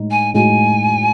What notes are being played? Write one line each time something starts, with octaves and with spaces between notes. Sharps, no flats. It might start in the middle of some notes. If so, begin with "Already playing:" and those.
Already playing: A2 G#3 D#4
G#5
A2 G#3 D#4 F#4 G#5